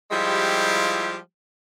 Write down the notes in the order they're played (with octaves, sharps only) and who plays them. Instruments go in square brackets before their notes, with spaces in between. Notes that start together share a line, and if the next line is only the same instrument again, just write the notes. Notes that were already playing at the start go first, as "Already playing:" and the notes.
[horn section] F3 G3 G#3 E4 F4 G4